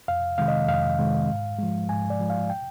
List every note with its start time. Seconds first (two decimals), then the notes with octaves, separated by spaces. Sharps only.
0.08 F2 F5
0.38 C3 D#3 G#3 F5
0.48 D#5
0.68 F2 F5
0.99 C3 D#3 G#3
1.29 G#2
1.59 F3 G#3
1.89 G#2 G#5
2.10 D5
2.20 F3 G#3
2.30 F5
2.50 G5